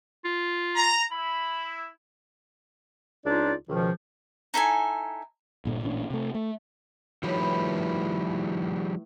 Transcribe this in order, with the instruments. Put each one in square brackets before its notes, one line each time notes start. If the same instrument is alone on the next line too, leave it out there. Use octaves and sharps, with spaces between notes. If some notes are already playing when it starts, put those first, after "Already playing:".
[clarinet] F4
[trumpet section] A#5
[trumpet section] E4 [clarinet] B5
[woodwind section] C#2 D4 D#4 F4 D5
C#2 B2 D#3 F3
[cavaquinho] D#4 E4 A4 G#5
[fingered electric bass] G1 A#2 D3
A1 A#2 C#4 D4
C3 A3
A3
[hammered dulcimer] A2 B4 [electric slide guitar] D#3 F3 G3